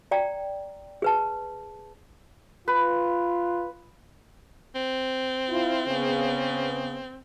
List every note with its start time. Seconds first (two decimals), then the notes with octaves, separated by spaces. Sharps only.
0.11 D5 G5 A#5
1.02 G#4 B4 A5
2.68 F4 B4
4.75 C4
5.50 E4 F4
5.87 C#3 B3